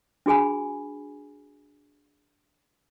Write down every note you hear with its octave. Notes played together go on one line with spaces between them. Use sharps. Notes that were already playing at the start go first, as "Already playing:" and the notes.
D4 F#4 G#4 G#5 B5